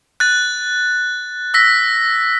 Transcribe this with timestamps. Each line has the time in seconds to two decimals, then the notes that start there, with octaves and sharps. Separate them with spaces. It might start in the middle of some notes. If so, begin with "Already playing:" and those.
0.20 F#6 A6
1.54 E6 A#6 B6